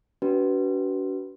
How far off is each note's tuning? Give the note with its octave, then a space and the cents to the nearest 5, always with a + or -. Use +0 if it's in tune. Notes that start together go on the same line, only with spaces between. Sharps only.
D4 -45 F#4 +35 B4 -5